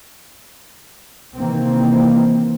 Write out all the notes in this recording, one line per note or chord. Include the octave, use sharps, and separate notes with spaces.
C3 D#3 E3 A#3 C4